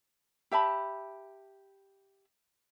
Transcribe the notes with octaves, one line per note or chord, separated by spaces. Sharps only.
G4 E5 A5 B5